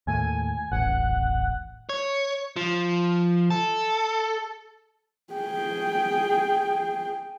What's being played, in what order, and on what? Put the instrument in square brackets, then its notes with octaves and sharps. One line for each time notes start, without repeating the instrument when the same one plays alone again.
[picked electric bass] D#2 A2 [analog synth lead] G#5
[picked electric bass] D#1 A1 [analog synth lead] F#5
[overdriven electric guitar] C#5
F3
A4
[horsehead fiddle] G#4 G5